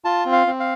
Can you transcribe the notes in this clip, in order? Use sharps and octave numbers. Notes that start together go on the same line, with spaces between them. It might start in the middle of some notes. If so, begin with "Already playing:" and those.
F4 A5
C4
F5
C4
F5